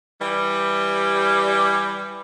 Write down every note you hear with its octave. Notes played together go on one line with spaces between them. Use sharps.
E3 G3